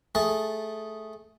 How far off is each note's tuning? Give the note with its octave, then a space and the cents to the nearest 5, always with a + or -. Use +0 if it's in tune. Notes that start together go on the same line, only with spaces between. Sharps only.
A3 -10 G#4 +0 A5 +0